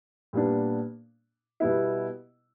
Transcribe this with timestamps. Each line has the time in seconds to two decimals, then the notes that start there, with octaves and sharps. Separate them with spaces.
0.33 A#2 G3 B3 D4
1.60 B2 G3 B3 E4